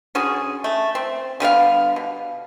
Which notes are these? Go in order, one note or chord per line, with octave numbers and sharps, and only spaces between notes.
D3 C#4 F#4 G#4
A3
C4
D3 G3 B3 F5
B2